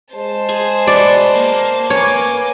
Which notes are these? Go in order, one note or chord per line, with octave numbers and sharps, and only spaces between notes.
G#3 C5 A5
G#4
F#4 B4 D5
A#3
B4 C#5 G#5 D6